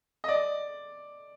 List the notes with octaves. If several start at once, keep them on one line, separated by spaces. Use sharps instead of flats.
D#5
D5